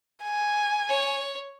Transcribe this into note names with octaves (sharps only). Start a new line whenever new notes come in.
G#5
C#5